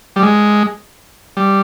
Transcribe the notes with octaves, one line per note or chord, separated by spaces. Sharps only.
G3
G#3
G3